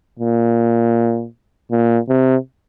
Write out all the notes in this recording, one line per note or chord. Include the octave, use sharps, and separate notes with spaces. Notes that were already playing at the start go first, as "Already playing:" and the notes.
A#2
A#2
C3